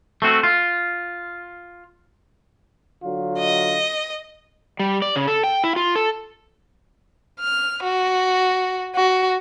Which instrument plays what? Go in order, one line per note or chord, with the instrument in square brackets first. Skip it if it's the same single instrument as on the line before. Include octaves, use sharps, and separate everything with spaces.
[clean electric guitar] A3 C4 F#4
F4
[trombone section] D3 F#3 F4
[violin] D#5
[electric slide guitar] G3
D5
C#3
A4
G5
E4
F4
A4
[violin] F6
F#4
F#4